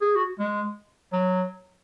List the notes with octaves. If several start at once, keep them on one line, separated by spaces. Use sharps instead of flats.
G#4
F#4
G#3
F#3